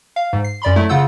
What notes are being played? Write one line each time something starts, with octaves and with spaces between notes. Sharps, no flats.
F5
G#2
C7
F#2 D5 B5 C6
F#3 A3 E4
C#3 F4 F#5 E6 G6